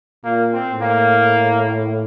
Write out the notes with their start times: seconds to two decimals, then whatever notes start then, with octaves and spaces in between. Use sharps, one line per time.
0.24 A#2 A#3
0.53 C4
0.68 A2
0.82 A#3